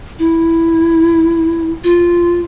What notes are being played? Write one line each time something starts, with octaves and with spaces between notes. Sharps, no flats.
E4
F4